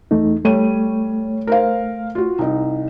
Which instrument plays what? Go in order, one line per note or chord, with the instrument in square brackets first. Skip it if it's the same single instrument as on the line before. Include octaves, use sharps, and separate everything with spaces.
[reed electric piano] E2 A3 D#4
[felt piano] G3 C#5 D#7 [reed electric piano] A3
[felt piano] A#4 C5 F5
F4 F#4
C2 D#4